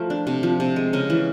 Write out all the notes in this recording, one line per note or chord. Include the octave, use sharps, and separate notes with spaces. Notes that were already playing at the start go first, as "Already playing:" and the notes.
Already playing: F3 A3 A#4
D4
C3
F3
C3
G#3
C#3 A#4
E3